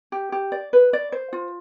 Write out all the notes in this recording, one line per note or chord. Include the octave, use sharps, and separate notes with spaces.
G4
G4
D5
B4
D5
C5
F4